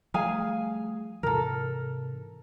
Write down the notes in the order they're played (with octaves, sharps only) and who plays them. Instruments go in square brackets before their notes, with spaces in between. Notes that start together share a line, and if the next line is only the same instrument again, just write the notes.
[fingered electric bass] F3 G3 A3 [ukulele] G#4 F5 G#5
[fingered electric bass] G#2 C3 E3 [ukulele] A4 A#4